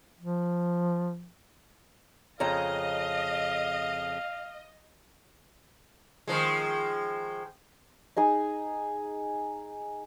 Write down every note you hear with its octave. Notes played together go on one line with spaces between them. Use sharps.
F3
F2 C#3 D#5 F5 A#5
D#3 F3 G#3
D#4 G#4 G#5